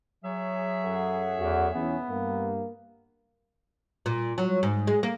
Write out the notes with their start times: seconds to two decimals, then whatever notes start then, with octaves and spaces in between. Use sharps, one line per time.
0.24 F#3 G#4 C#5 E5
0.85 F#2 A4 F#5
1.39 E2 F#4
1.75 B1 E2 B3 C#4
2.09 G2 A#3
4.06 A#2
4.38 F#3
4.63 G#2
4.87 G#3
5.03 A#3